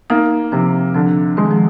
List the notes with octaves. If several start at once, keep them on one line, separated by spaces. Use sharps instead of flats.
A#3 D#4
C3 F3
D3 F3
D#3 G#3
F3